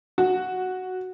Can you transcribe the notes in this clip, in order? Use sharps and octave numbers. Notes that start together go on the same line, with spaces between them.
F#4